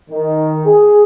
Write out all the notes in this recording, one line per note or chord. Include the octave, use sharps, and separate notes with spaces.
D#3
G#4